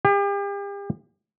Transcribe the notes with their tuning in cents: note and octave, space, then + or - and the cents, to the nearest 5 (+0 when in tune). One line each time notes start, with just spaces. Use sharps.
G4 +40